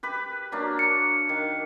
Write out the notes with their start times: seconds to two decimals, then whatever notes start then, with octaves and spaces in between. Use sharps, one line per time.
0.03 G4 B4 B5
0.52 F#3 A#3 D4
0.79 C#7
1.29 D#3